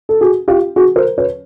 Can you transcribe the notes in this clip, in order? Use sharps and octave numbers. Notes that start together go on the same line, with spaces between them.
A4
F#4 G#4
F4 G4
F#4 G#4
A#4 C5
B4 C#5